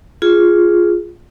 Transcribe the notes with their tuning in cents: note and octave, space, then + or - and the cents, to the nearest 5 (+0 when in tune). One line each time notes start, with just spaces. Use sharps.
F4 +0 G#4 +0